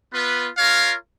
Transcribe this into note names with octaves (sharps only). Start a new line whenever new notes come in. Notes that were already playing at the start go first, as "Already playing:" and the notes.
B3 F4 B4
F4 A#4 C#5 F5